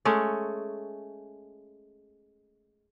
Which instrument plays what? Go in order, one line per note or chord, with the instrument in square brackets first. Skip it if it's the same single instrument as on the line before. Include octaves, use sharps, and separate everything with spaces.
[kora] G#3 A3 C#4